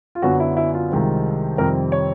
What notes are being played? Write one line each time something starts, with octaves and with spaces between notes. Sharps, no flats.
F4
F#2 D3 F#3 B3 D4 F#4
E4
E4
F4
C2 C3 D#3 G#3 C4
F2 C3 D#3 G3 C4 A#4
C#5